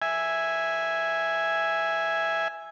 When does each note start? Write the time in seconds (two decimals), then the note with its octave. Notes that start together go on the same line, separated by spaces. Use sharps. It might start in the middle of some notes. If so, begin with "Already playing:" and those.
0.02 E5 G#5